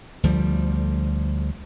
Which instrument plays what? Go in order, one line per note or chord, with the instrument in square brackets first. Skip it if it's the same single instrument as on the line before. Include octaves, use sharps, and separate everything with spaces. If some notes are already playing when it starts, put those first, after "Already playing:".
[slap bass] D2 F3 G3